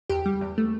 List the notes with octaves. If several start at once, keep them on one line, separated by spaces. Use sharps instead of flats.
E2 G4
G3
E2
A3